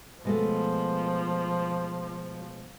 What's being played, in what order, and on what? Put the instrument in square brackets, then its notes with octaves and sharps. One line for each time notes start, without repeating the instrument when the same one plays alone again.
[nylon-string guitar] B2 G#3 A3 [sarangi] F3